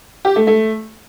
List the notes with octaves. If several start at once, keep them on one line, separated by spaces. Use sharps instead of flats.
G4
A3
A3